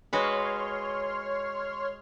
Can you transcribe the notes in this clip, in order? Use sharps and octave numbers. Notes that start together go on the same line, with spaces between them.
G#3 F#4 B4 C#5 C6 F6